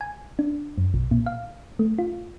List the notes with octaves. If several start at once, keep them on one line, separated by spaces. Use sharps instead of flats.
G#5
D4
F#2
B1
A#2
F5
A3
F4